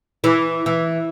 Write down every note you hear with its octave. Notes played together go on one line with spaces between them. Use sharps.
E3
E3